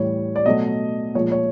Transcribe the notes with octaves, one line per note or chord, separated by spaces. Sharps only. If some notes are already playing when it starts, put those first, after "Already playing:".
Already playing: A2 E3 G3 C#5
D5
B2 F#3 A3 D#5
A#2 F3 G#3 C#5
C#5